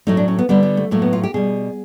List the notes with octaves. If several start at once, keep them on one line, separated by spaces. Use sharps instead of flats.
A2 F#3 A3 D#4
D4
C#4
B3
D3 G3 B3
B3
A3
A2 F#3 A3 A#3
B3
F4
G4
B2 G3 G#4